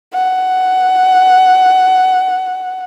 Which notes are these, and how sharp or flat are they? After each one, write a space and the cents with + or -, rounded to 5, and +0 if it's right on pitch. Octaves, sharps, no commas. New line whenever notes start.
F#5 +10